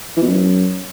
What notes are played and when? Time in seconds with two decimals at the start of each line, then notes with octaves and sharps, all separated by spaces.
0.17 E3
0.22 B2
0.27 F#2